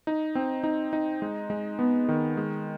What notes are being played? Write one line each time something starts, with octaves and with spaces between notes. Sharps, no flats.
D#4
C4
D#4
D#4
G#3
G#3
B3
D#3
G#3